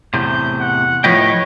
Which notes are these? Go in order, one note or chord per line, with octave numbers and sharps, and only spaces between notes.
E2 A2 C3 G6
F#5
A2 F3 B4 C#5 D#5 G5